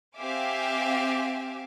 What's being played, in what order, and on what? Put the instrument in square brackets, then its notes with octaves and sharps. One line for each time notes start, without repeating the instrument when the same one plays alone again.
[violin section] C4 G4 E5 F5 G#5 D6